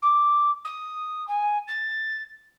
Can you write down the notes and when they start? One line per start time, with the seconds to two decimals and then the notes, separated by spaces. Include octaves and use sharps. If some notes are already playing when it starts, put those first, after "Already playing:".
0.02 D6
0.64 D#6
1.27 G#5
1.67 A6